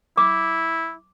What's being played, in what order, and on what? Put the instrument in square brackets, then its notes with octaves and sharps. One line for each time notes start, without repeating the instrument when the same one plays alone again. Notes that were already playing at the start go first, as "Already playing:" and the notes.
[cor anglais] E4 [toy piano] D6